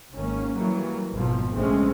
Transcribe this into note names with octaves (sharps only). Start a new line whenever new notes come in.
G#1 D#3 A#3 C#4
E3 F#3 G3 A#3
G#1 F2 B2 F3
A#1 C#3 G#3 A3 C4 C#4